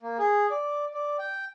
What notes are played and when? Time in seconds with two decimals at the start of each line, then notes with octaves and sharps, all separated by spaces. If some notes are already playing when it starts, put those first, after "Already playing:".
0.01 A#3
0.19 G#4
0.51 D5
0.94 D5
1.19 G5